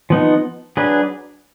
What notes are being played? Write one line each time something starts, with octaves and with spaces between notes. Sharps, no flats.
F3 B3 D#4
F#3 D4 G#4 B4